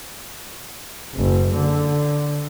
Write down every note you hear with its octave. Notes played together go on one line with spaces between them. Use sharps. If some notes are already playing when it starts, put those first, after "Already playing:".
F#1
D3